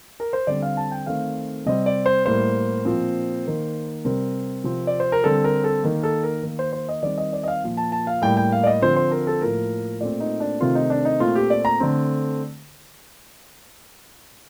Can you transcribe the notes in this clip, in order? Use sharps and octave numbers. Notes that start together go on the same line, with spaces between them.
A#4
C5
D3 G3 C4 D5
F5
A5
G5
D#3 A3 C4 F5
C3 G3 C4 D#5
D5
C5
A2 G3 A#3 C5
A#2 F3 C4
D#3 A#3
C3 G3 C4 A#4
C3 F3 C4
D5
C5
A#4
D3 G3 C4 A4
A#4
A4
D#3 A#3
A4
A#4
D#3 A#3
C5
C5
D#5
D#3 G3 C4 D5
D#5
D5
D#5
F5
A#2 F3 A#3
A5
A5
F5
A2 G3 A#3 G5
G5
F5
D5
D#5
D3 F3 C4 C5
C5
A#4
A4
A2 F3 A#3 A#4
A#2 A3 C4 D5
D#4
D4
C3 D#3 A3 C4 F4
D#4
D4
D#4
A#2 A3 C4 F4
G4
D5
A#5
D3 A3 C4